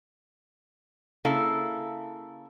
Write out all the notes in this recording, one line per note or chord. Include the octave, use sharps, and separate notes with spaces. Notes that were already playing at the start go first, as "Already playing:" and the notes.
C#3 A#3 E4 A4 F5